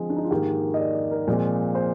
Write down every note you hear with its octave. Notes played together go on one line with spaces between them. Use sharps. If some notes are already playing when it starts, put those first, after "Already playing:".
Already playing: D3 F3 G#3 C4
D4
D#4
F4
G#2 D#3 A#3 G4
D#5
D5
D5
A#4
A#2 F3 G#3 C4
C5